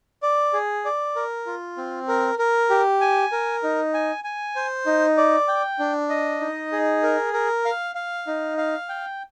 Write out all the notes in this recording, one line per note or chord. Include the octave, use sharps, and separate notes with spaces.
D5
G#4
D5
A#4
F4
C4
A#4
A#4
G4
G#5
A#4
D#4
G#5
G#5
C5
D#4
D5
G5
D4
D#5
D#4
G#4
A#4
A#4
F5
F5
D#4
F5
G5